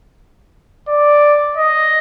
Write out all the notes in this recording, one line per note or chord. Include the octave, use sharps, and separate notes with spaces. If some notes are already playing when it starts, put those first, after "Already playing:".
D5
D#5